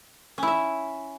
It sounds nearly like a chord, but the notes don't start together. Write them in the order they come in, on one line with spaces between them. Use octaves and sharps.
C#4 E4 E5